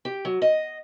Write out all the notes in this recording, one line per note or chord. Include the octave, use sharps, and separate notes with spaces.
G4
F#3
D#5